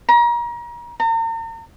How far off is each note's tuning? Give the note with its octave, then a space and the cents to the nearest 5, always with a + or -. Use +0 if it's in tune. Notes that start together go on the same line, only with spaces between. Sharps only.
A#5 +35
A#5 -40